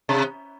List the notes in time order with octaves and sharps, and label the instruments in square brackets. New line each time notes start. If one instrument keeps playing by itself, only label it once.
[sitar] C3